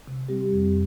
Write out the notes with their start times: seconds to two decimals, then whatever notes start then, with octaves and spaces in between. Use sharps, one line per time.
0.08 C3
0.29 G3 C4 G4
0.51 F2